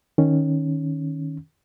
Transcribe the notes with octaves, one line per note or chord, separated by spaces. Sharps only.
D#3 C#4